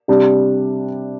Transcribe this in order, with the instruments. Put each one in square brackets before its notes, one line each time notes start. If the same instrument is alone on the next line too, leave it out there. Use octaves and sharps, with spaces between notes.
[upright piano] C3 G3 D4